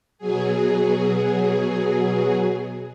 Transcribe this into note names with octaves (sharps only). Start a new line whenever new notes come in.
B2 F#3 G#4